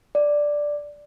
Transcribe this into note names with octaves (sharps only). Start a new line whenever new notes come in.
D5